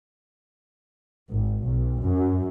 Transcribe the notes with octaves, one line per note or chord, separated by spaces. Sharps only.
G#1
B1
F#2